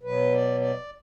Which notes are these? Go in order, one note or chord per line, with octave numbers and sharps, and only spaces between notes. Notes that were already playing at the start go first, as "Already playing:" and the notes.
B2 F#3 B4
D5
D5